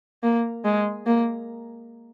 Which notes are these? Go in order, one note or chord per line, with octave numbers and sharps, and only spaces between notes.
A#3
G#3
A#3